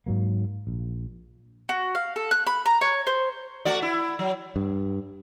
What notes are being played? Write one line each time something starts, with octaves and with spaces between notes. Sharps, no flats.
G#2 F#3 A#3
A#1
F#4
F5
A4
F#6
B5
A#5
C#5
C5
A3 F#4 D5
E4
F#3
G2